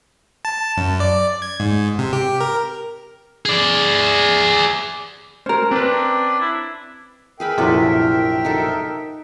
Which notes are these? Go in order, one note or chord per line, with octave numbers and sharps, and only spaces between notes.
A5
F#2
D5
G#6
G#2
C3
G4
A#4
G#4 D5
C#4 A#4 C5
C4 D4 B4
E4
G#4 A#4 B4 E5 G5 B5
A#1 F#2 C3 E4 A4 B4
D#4 F#4 A4